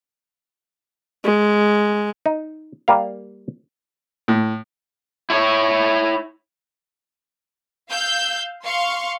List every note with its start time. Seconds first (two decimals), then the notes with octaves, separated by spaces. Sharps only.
1.24 G#3
2.26 D#4
2.88 G3 A#3 F5
4.28 A2
5.30 E4 C#5
7.90 F5 E6 G6
8.63 F5 C6 C#6 C#7